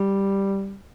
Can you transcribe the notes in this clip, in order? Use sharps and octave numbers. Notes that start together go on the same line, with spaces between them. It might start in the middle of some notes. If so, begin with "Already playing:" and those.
Already playing: G3